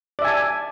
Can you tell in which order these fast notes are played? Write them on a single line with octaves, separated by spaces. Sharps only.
D5 E5 G#5 A5